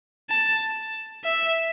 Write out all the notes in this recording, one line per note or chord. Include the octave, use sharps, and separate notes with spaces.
A5
E5